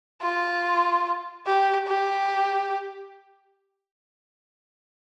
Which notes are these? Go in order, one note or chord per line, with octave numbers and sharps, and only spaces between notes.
F4
G4
G4